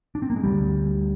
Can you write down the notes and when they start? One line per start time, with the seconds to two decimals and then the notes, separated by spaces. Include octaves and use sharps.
0.15 D4
0.22 C4
0.30 A#3
0.36 G#3
0.43 D2 D3 G3